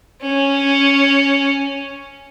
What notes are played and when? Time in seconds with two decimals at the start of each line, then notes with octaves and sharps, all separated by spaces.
0.22 C#4